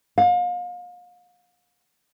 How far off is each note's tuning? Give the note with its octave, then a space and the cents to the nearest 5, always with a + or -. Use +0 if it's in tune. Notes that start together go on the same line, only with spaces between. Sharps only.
F5 +35